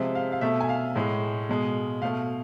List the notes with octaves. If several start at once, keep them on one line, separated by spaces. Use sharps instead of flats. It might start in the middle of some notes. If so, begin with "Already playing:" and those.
Already playing: C3 F3 G#3 E5
F5
F5
B2 A3 E5
G#5
F5
A2 G#3
B2 G#3
B2 A3 F5